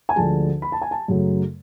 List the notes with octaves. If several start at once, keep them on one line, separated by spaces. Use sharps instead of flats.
G#5
D2 D3 F3 G#3 A5
B5
A5
G#5
A5
F#2 C#3 F#3 A3